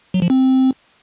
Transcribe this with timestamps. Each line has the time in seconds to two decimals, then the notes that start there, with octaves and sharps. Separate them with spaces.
0.14 F#3
0.22 F3
0.30 C4